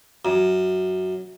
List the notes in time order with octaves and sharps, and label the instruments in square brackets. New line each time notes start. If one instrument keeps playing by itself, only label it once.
[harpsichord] F#2